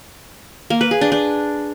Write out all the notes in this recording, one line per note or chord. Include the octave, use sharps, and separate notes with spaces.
A#3
B4
G#4
D4
D4